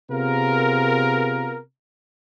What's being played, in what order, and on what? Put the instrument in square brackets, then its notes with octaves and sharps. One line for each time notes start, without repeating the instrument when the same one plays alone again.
[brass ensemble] C3 B3 F4 G#4 A#4